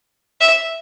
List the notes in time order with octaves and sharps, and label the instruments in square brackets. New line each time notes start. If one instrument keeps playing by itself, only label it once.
[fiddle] E5